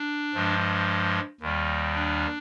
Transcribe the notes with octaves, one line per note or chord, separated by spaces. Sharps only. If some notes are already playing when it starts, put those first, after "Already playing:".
Already playing: D4
G2 F3 G#3
D#2 D#3 G3
D4